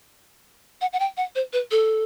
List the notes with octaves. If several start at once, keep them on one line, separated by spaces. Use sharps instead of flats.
F#5
F#5
G5
F#5
C5
B4
A4